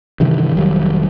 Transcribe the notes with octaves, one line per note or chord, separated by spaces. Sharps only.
G2 C3 D#3 E3
F1 D#3 F#3 G3